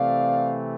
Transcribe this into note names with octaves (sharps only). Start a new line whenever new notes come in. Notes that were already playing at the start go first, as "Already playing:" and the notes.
Already playing: C3 E3 A3 C4 D5 F5